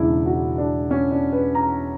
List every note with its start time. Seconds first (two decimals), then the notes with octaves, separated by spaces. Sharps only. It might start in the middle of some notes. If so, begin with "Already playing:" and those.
Already playing: E1 E2 C#3 D4 E4
0.26 F#4
0.58 D4
0.91 C#4
1.12 D4
1.32 B4
1.55 A#5